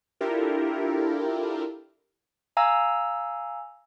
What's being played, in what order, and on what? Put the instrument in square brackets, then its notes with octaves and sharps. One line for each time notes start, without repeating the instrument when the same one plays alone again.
[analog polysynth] D4 E4 F4 G4 A4 A#4
[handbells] F5 G#5 A#5 E6